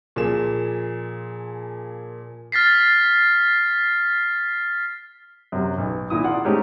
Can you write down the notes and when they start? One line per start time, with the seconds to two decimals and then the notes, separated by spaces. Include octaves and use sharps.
0.16 A#2 F3 G#4 E7
2.52 F6 A6 B6 C7
5.52 F#2 C3
5.78 B1
6.10 A#2 D#3 E4 D#6
6.24 F4 D5 F#5
6.44 G#3 A3 C4 C#4 D#4 G4